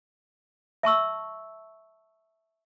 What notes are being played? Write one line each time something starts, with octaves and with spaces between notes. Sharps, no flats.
E5 A5 C#6 E6